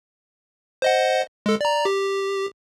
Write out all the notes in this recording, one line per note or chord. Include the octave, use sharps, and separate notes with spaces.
C5 D#5 F#5
G#3 A4
D5 A#5
G4